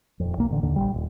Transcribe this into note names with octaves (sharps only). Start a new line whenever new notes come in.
D#1 F2
B1 A#3
A1 D3
D#2 D3
A#1 D#2 G3
D#1